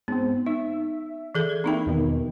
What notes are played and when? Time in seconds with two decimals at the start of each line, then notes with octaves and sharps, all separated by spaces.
0.08 G#2 B3 C4
0.46 D#4 E5
1.35 E3 G#4 A4
1.49 G#6
1.64 A#3 C4 D#4 E4 G5
1.86 E2 B2 D#3